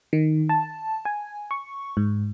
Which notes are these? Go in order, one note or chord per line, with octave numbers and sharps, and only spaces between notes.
D#3
A5
G#5
C#6
G#2